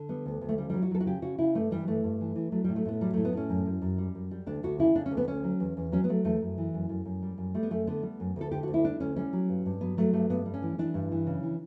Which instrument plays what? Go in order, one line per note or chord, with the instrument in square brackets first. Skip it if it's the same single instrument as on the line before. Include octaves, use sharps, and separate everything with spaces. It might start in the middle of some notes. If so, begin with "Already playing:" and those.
Already playing: [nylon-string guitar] D3
G3 B3
D2
D2
A3
C#3 G3
F#3 G3
F#4
F#3 A4
F#4
C#3 G4
C#3 F#4
C#3 E4
G2 A3
E3 G3
G2 A3
G2
E3
E3
F#3 A3
A2 G3
A3
A2 B3
F#3 G3
A2 A3
B3
A2 C#4
F#2
F#2
F#2
G3
F#2
G3
D2 D4
D2 F#4
C#3 E4
C#3 D4
C#4
D2
B3
D2 C#4
F#3
E2
E2
F#3 C#4
B3
F#3 A3
E2 A3
F#2
E3
F#2
F#2
F#2
G3
F#2
G3 A3
B3
F#2 A3
D3 B3
G3
F#2
D2 A4
D3 G4
D2 F#4
E4
G3 D4
D2 C#4
G3 C#4
F#3
G2
G2
F#3 B3
F#3 A3
G2 A3
G2 B3
G3
C#4
E3
E3 D4
G2
E3
C#3
E3